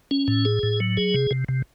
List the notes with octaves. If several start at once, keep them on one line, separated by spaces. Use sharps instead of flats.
C#4
A2
G#4
A2
F#3
G#4
C3
C3
C3